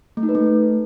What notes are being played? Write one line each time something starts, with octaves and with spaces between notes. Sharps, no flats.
A3
D#4
B4
A3